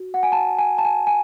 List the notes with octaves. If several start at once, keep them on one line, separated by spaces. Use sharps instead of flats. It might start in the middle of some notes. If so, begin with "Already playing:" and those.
Already playing: F#4
F#5
G#5
A5
G#5
A5
G#5
G#5